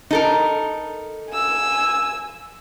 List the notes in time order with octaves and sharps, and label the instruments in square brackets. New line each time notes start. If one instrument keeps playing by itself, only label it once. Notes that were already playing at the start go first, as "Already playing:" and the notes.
[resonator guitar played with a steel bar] D#4 A4 A#4
[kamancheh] G#5 E6